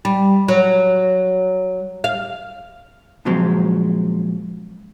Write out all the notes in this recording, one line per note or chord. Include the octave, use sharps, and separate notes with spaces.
G3
F#3
F5
A#2 C#3 F3 F#3 G#3 C4